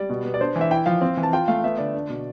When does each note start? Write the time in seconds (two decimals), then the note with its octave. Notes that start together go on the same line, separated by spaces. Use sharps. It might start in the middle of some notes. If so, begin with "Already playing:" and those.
Already playing: G3 D5
0.10 B2
0.24 B3
0.34 D5
0.41 D4 C5
0.56 E3
0.61 E5
0.71 E4 G5
0.86 F3 F5
1.01 C4
1.17 E3
1.23 A5
1.33 F4 G5
1.48 A3 F5
1.63 B3 E5
1.78 D3 D5
1.94 D4
2.10 B2